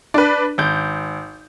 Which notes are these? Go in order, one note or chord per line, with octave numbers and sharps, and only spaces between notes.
D4 B4
G#1 G6